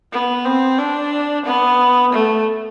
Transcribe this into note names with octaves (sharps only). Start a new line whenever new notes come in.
B3
C4
D4
B3
A3